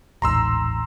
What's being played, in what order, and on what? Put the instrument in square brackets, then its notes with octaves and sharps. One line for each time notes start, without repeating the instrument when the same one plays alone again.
[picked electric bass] D#1 A1 G#2 [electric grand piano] A#5 C6 E6